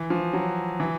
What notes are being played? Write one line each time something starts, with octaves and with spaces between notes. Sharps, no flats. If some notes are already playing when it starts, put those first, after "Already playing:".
Already playing: E3
F3
F#3
E3